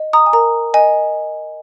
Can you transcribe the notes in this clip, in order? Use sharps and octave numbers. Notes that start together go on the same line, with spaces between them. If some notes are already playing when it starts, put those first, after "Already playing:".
Already playing: D#5
A#5 D#6
G#5
A#4 A#5
D#5 G#5